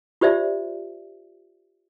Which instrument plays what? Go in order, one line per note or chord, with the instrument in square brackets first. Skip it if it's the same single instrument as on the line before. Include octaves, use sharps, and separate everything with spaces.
[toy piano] F4 G4 C5 D5 E5